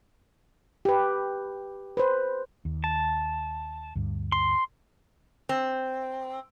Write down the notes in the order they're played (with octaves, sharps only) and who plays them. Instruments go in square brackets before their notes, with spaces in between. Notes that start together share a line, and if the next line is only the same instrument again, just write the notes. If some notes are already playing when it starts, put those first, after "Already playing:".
[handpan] G4 B4
B4 C5
[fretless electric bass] D#2
[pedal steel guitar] A5
[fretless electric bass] D2 G2
[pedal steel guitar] C6
[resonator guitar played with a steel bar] C4